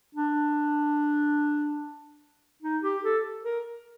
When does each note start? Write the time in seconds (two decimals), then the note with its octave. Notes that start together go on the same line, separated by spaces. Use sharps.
0.15 D4
2.63 D#4
2.83 G4
3.04 A4
3.44 A#4